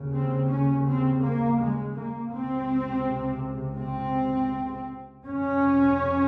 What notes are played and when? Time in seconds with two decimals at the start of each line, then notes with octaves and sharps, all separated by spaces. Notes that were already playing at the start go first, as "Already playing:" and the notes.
Already playing: D#2 C#3
0.14 C4
0.50 C#4
0.87 C4
1.23 A#3
1.60 G#3
1.97 A#3
2.32 C#2 C3 C4
3.79 C4
5.25 F2 C3 C#4